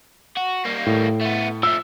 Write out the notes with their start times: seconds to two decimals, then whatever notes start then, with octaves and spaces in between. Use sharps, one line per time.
0.37 F#4
0.65 G3 A#3
0.86 A2
1.21 A3 B3
1.63 F3 A3 E6